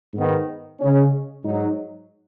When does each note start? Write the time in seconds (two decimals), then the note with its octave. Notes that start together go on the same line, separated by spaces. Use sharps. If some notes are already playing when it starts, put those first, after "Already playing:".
0.14 G#2 D#3 B3
0.80 C#3 G#3 C#4
1.44 G#2 F#3 D#4